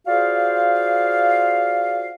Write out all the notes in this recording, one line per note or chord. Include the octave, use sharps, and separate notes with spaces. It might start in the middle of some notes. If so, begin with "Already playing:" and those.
F4 F#4 G#4 C5 D5 F5